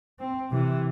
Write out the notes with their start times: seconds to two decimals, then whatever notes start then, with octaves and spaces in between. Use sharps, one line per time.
0.19 C4
0.50 C3 E3